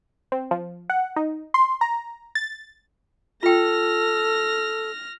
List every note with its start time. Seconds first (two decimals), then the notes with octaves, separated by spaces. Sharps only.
0.32 C4
0.51 F3
0.90 F#5
1.16 D#4
1.54 C6
1.81 A#5
2.35 A6
3.43 F4 A4 G5 F6 A#6